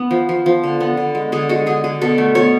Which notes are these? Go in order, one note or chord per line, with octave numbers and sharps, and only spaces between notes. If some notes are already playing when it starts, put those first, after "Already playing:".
Already playing: B3
F3
F3
F3
D3
B3
D3
G#3
D3 G#4
G#3 F#4
D3 G#4
D3 G#4
B2 A4
A3
B2 C#5